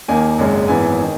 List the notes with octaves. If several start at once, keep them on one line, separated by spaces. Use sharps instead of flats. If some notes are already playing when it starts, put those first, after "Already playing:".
D#2 D#3 A#3 G#5
G#1 F#2 C#3 G#3
G#1 F#2 E3 B3 G#5
D#3